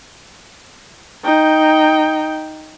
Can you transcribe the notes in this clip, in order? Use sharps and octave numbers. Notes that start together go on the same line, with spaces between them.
D#4 G5